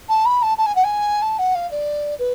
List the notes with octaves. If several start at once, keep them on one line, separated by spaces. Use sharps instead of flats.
A5
B5
A5
A5
G#5
F#5
G#5
A5
F#5
F5
D5
B4